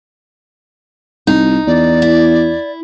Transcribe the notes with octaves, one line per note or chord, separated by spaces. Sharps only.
C2 D#4
E2 D5
E4